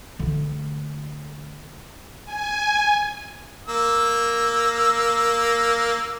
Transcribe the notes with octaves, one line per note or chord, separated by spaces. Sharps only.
D3 A3
G#5
A#3 E6